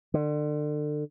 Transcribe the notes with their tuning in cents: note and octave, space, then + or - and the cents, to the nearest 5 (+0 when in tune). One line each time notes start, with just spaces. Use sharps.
D3 +30